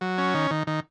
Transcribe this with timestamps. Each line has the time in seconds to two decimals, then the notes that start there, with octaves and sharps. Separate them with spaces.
0.01 F#3
0.18 C#4
0.34 D#3
0.51 D#3
0.67 D#3